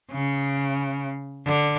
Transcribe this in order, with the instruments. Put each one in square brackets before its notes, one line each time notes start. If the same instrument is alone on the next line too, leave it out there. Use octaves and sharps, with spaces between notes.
[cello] C#3
D3